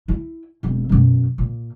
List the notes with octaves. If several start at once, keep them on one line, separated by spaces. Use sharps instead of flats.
E4
E1 C4
F#2 B2
A#2